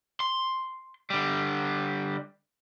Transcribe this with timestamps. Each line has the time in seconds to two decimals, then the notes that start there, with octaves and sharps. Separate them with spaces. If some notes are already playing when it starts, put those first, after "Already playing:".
0.20 C6
1.10 D3 G3